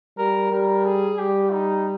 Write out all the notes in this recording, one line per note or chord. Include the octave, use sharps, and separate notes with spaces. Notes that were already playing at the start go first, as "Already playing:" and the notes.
G3 A#4
G3 A#4
G#4
G3 G4
D#4